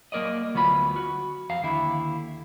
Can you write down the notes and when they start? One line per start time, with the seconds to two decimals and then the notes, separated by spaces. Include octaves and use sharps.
0.12 F#3 A#3 A#4 D5 D#5
0.54 D2 F#3 B3 F4 B5
0.96 F#4
1.50 F2 F5 A#5
1.63 D#2 D3 E4